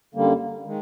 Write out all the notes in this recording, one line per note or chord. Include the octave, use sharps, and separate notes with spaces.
F#2 D3 G3 A#3
D#3 G#3